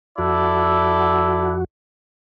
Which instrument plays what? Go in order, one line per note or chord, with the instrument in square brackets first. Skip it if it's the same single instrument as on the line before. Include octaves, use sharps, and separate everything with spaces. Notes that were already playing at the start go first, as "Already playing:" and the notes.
[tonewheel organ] F2 F#4 [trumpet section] E4 A4 D5